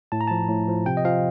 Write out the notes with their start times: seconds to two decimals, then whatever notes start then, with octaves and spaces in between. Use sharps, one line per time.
0.12 A2 A5
0.21 A#5
0.28 F3 A5
0.49 A2
0.68 F3
0.86 C3 G5
0.97 D#5
1.05 F3 F5